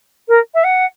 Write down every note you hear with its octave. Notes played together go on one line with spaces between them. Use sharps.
A#4
E5
F#5